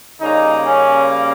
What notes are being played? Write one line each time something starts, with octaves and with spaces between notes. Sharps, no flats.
C#3 G3 A#3 C#4 D#4
C#4